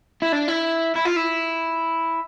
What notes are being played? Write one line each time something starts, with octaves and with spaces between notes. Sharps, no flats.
E4
D4
E4
E4
F4
E4